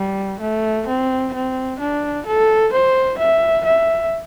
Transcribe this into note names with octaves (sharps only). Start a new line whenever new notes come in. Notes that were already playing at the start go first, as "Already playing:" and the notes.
Already playing: G3
A3
C4
C4
D4
A4
C5
E5
E5